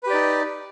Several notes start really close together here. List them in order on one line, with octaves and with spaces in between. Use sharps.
B4 G4 D5 D#4